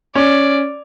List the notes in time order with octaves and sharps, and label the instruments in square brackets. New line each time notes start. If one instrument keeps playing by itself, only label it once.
[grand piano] C#4 [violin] D5